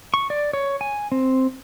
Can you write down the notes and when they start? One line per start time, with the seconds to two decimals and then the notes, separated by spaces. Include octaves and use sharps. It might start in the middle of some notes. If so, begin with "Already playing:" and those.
0.14 C#6
0.30 D5
0.53 C#5
0.81 G#5
1.12 C4